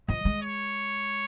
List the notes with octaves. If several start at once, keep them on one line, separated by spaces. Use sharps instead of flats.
F3 D#5
G#3
C#5